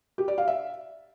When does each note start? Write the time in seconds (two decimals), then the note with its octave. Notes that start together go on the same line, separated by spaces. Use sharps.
0.18 G4
0.28 D5
0.38 F5
0.48 E5